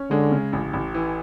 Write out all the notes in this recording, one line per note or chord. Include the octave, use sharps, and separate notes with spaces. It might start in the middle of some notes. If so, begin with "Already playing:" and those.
Already playing: C#4
D3 G#3
C#3
A1
A1
E3